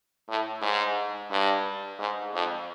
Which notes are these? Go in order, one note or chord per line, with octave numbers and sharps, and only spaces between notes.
A2
G#2
G2
G#2
F2